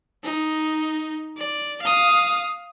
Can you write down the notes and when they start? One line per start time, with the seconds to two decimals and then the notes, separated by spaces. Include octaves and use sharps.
0.24 D#4
1.38 D5
1.82 F5 D#6